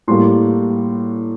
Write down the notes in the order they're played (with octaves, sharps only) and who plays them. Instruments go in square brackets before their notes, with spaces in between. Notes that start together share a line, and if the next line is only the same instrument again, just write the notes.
[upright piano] A2 G3 A#3 C6